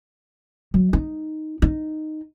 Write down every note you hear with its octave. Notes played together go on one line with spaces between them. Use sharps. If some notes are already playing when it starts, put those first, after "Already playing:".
F#3
D#4
D#4